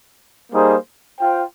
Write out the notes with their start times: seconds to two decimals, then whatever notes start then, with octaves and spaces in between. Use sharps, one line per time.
0.52 G3 A#3 D#4 G#4 C5
1.19 F4 C5 G5